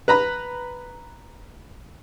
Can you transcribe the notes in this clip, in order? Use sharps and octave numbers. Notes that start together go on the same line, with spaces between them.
B4 A#5 B5